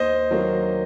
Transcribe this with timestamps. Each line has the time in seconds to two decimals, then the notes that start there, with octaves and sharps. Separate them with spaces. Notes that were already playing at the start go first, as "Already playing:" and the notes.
Already playing: D#2 C5 D#5
0.30 D#3 F#3 A#3